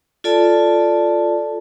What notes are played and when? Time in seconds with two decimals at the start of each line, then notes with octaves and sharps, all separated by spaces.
0.24 F4 A4 D5 A5